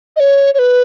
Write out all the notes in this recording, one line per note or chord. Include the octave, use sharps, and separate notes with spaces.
D#5
C#5
C#5
B4